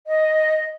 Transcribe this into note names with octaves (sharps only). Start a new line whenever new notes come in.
D#5